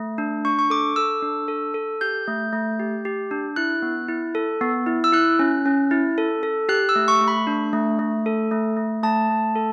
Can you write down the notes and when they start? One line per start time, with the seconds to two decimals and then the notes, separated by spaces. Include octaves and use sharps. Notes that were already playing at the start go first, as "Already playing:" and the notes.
Already playing: A3
0.18 D4
0.45 D4 C#6
0.59 C#6
0.70 A4 D6
0.96 A4 E6
1.22 D4
1.48 A4
1.74 A4
2.01 G4 G6
2.28 A3
2.53 A3
2.79 G4
3.05 G4
3.31 D4
3.56 E4 F#6
3.82 B3
4.08 E4
4.35 A4
4.61 B3
4.87 E4
5.04 E6
5.13 E4 F#6
5.39 C#4
5.66 C#4
5.91 E4
6.18 A4
6.43 A4
6.69 G4 F#6
6.89 E6
6.96 A3
7.08 C#6
7.21 A3
7.28 B5
7.47 D4
7.73 A3
7.99 A3
8.26 A4
8.51 A3
8.77 A3
9.03 A3 A5
9.29 A3
9.56 A4